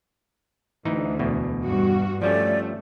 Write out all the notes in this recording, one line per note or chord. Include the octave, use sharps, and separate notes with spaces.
D2 E3 D#4
E2 B2
G2 F#4
F3 G3 A3 C#4 D5